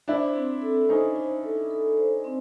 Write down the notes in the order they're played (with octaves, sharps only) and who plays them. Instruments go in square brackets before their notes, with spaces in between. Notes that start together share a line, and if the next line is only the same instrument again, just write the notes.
[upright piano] D4 E4 [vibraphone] C5
[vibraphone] C4
A4
[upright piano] C#4 D#4 [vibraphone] C5
[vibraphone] E4
A4
A4
C5
C4